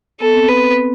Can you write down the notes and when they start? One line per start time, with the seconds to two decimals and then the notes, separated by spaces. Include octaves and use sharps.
0.20 B3 A4
0.34 C4
0.48 B4